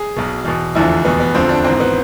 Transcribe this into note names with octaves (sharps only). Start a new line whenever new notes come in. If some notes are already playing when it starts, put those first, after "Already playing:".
Already playing: G#4
B1 B2
E2 B2
F1 E2 D3 F3 E4
F1 E2 B2 B3
B3
E1 D2 D3 F3 C4
D4
G#1 G#2 E3 C4
B3